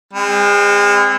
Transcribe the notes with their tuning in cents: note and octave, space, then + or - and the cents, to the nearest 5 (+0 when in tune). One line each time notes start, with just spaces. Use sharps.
G#3 -35 C4 +0